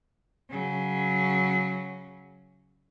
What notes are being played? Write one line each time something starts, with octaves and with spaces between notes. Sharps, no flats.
C#3 F#3